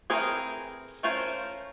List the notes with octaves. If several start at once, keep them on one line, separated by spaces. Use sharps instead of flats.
E3 A3 C4 G#4 A#4
A3 C#4 F4 A#4 C5